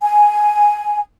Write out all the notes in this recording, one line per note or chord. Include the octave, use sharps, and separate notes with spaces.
G#5